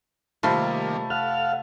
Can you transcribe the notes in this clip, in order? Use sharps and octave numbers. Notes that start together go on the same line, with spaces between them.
C3 D#3 G3 A3 A#3 F4 A5 B5
A4 F5 F#5 F6